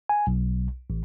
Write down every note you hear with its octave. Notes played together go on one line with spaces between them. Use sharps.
G#5
B1
A1